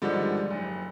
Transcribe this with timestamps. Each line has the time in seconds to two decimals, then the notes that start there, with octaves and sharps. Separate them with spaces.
0.02 G#2 D3 D#3 F3 G3
0.50 F#1